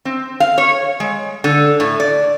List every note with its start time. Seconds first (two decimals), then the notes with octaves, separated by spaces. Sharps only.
0.05 C4
0.40 F5
0.58 C#5
1.00 G#3
1.44 D3
1.80 A2
2.00 D5